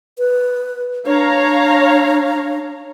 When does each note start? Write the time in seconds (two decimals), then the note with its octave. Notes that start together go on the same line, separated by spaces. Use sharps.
0.18 B4
1.06 D4 C#5 F5 A#5